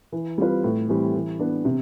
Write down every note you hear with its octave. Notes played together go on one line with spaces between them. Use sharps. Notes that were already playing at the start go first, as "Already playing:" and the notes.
E3
G3 C4 F4 B4
A2
E3 G3 C4 G4
E3
B3 D4
C3